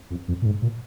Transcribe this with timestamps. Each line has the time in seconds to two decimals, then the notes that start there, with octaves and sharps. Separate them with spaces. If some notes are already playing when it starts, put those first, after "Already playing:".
0.11 F2
0.28 F2
0.42 A#2
0.46 G#2
0.62 A#2